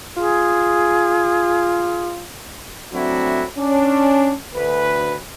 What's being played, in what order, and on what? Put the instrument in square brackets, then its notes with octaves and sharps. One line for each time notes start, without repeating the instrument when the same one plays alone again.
[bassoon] F4 [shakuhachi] G#4
[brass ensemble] F#3 A3 C4 D4 E4 F#4
C#4 D4
D2 B4